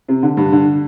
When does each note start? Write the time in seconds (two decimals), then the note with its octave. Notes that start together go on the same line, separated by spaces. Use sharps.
0.09 C3
0.23 D3
0.37 G2
0.52 D3